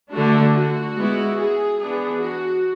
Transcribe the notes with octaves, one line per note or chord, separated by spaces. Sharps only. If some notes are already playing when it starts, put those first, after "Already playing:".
D3 A3 D4 F#4
F#4
G#3 B3 E4
G#4
E3 B3 D4 G#4
F#4